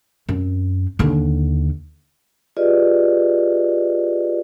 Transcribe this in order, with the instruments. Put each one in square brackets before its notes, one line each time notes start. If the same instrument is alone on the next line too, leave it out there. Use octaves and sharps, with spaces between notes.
[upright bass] F#2 C4
D#2 D3
[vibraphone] F4 G4 G#4 B4 D5 D#5